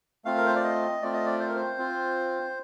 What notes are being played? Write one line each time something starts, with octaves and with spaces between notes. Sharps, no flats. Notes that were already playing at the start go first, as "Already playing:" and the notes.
A3 C4 F4 F5
A#4
C5
D5
D#5
A3 C4 F4 D5
D#5
D5
C5
A#4
C5
C4 F4